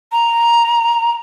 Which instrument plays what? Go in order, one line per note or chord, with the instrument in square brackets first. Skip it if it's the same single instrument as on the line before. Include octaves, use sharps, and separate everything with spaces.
[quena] A#5